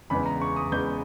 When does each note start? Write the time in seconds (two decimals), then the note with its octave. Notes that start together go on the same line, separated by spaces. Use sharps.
0.10 E2 C#3 G#3 B3 B5
0.26 A#5
0.41 C#6
0.56 D#6
0.72 E2 C#3 G#3 B3 G6